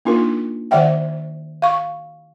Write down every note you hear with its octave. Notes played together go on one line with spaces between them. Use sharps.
A#3 D4 D#4 F4 A#4
D#3 C5 D5 E5 F#5 G5
F5 C#6